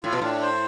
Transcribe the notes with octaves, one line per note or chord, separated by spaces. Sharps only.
A2 F4
B2
A2 D4
C5